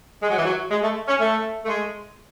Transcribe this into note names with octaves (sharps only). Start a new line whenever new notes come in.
G#3
F#3
E3
F#3
G#3
A3
C#4
A3
A3
G#3